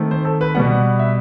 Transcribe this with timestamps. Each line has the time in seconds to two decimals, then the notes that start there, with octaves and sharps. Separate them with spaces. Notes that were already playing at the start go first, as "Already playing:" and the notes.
Already playing: D#3 A3 C4
0.11 C5
0.25 A4
0.41 B4
0.55 B2 G3 B3 F#5
0.99 E5